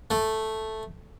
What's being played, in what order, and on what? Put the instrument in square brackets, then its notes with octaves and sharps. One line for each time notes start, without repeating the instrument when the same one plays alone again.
[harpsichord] A3